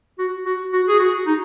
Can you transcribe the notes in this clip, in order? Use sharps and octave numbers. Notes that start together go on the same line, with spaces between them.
F#4
F#4
F#4
G#4
F#4
D#4